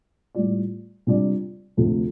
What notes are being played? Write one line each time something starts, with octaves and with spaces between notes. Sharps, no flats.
A2 G3 F4 D5
C3 G3 D4 F4 D5
D2 C3 F3 A3 F4